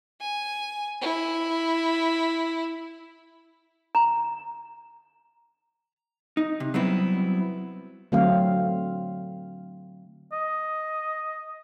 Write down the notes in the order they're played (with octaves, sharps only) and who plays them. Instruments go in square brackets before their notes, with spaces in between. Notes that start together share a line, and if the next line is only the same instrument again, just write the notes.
[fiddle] G#5
E4
[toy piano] A#5
[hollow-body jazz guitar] D#4
C3
F#3 G3 B3 C4 E4
[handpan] D3 F#3 A3 C4 F5
[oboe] D#5